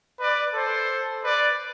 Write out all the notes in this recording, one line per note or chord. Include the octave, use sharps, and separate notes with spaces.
B4 D5
A4 C5
B4 D5